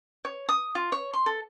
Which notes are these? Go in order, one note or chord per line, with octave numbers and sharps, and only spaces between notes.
C#5
D#6
F4
C#5
C6
A4